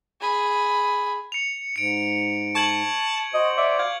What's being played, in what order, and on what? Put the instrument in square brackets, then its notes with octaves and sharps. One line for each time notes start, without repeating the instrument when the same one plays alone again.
[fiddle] G#4 B5
[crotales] C#7 F7
[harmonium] G#2 [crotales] C#7 D7
[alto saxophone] A5 [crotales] C#6 G#6 F#7
[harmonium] F#4 C5 [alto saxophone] D#5
[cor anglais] D5 [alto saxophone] E5
[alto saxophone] F5 [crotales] G#6